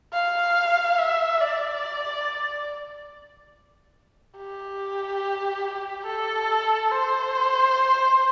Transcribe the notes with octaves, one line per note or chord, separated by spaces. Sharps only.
F5
E5
D5
G4
A4
C5